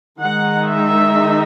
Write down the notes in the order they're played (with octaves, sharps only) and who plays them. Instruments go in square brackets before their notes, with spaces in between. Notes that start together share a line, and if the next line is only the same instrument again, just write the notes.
[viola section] D#3 G#3 D#4 F#5
E5